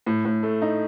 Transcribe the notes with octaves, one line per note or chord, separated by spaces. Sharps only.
A2
A2
A3
D#4